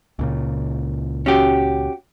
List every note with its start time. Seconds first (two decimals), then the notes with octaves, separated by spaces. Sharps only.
0.19 C#2 A#2 C#3
1.26 C#4 F#4 G4